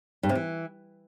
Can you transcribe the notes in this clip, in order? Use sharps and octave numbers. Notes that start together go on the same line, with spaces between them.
G2
C3
E3